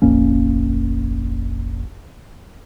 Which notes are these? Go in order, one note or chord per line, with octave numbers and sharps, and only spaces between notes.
F1 A#1 A#3 C#4